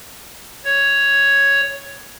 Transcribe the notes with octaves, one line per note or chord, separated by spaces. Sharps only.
C#5